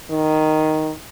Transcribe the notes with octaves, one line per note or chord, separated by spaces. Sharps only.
D#3